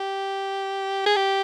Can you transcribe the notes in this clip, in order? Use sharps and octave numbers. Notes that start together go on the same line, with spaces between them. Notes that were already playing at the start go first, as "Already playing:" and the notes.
Already playing: G4
G#4
G4